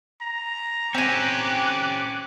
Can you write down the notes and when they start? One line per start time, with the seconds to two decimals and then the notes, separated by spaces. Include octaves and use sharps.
0.21 A#5
0.94 C4 C#4 G4 G#5 D6 F#6